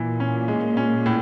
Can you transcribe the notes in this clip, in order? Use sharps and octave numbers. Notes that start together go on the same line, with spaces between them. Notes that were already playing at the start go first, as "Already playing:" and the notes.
Already playing: A#2 E3
C#4
G#3
C#4
A2